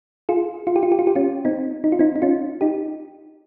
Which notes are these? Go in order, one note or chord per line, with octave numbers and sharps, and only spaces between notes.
F4 G#4
F4
G4
F4
G4
F4
G4
C#4 F4
C4 D#4
D#4
F4
C4 D#4
D#4
C#4 F4
D#4 G4